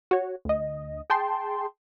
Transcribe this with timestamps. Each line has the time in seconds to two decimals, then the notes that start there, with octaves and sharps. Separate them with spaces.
0.11 F#4 C#5
0.45 D2 D#5
1.10 G#4 G5 A5 C6